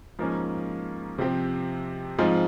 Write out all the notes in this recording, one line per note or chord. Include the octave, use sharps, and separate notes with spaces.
G#2 F3 A#3 C#4
C3 F3 C4 G4
G#2 F3 G#3 C4 F4